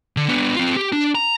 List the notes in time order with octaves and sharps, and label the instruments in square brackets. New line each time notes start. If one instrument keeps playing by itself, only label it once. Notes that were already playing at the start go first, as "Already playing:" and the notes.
[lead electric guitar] D3
B3 D4
C4 F4
G4
D4
A#5